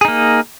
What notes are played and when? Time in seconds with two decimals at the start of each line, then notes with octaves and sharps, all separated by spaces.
0.01 G#4
0.05 D#4
0.08 A#3